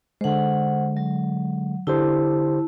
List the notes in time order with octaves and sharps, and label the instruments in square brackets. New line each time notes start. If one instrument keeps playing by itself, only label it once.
[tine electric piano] D3 G#3 [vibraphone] C5 F#5
[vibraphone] F#3
[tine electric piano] D3 G4 C5 [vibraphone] E4 A5